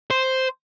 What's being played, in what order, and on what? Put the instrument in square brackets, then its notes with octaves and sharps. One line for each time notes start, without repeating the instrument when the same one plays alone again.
[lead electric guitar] C5